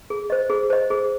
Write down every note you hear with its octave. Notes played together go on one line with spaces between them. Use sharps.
G#4
C5 D#5
G#4
C5 D#5
G#4